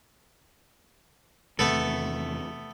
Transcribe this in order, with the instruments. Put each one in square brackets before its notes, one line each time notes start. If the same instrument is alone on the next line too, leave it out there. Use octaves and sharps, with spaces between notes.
[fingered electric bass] E2 C3 D#3 [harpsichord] A3 B3 A4